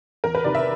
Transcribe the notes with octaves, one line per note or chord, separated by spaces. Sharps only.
E2 A#4
B4
C3 D#3 D5
E5